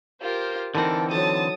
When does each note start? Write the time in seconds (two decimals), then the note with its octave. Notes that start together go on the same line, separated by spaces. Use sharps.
0.22 F4 G4 A#4 C5
0.75 D3 E3 C4 D#4 A4 A#4 F#5
1.11 F#3 A4 A5 D#6